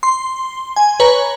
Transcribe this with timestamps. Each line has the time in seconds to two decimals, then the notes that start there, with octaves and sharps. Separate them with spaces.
0.03 C6
0.76 G#5
1.00 B4 C#5 A#5